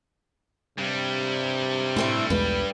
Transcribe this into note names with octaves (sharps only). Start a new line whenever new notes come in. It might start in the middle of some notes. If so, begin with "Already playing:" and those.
G2 C3 G3
A2 A3 C4 E4
B1 E2 G#3 B4